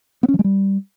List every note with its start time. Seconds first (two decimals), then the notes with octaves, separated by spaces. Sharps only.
0.23 B3
0.28 C#4
0.34 F3
0.39 G#3
0.44 G3